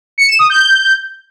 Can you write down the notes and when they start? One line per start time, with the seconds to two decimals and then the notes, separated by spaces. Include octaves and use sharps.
0.18 C#7
0.28 E7
0.39 D#6
0.50 G6